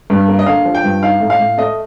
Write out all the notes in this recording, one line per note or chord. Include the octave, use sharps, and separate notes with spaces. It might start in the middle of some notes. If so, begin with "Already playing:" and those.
G2
A#3
D#5
D3 F5
F3
G5
G2
D#4 F5
A2
F5
A2
A3 D#5